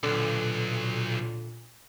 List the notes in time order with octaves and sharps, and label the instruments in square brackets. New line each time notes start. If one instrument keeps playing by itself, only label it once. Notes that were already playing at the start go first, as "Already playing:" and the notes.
[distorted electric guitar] B1 [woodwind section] A#2 [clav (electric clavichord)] D3